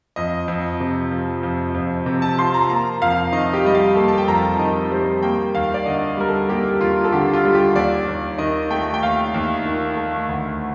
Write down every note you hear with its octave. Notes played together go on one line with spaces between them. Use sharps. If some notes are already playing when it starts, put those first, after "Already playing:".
F2 D#5
F2
C3
F3
F2
F2
C3
A5
F3 C6
A#5
A#3 A#5
F2 F5
D#3 D#5
G4
G3 D#5
F5
A#3 A4
A5
G5
F2 A#5
A5
D#3 D#5
G3 C5
A#3 G5
D#2 F5
D5
D3 D#5
G3 A#4
A4
A#3 G4
D#2 F4
A4
D3 G4
F4
G3
G4
D#2 D5
D#2
D#3 D#5
A3 G5
G5
D#2 F5
D#2
D#3
A3
D2